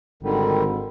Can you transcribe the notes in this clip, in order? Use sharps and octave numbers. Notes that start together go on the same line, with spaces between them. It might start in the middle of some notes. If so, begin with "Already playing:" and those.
G#1 D3 D#3 G3